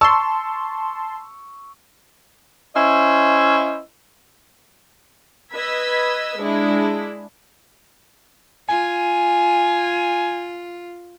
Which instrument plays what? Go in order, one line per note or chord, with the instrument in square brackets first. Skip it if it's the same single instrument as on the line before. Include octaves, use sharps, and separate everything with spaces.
[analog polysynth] A5 C6 [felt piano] C#6 E6
[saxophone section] C#4 E4 C5 D#5 E5
[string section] B4 D#5 E6 G#6 B6
G#3 D4 E4
[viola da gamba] F4 [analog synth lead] G#5